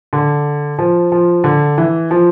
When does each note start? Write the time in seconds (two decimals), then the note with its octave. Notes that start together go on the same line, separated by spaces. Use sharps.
0.13 D3
0.79 F3
1.12 F3
1.44 D3
1.78 E3
2.11 F3